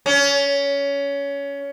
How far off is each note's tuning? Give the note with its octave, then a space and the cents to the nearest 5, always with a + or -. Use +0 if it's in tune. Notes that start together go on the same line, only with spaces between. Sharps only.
C#4 +20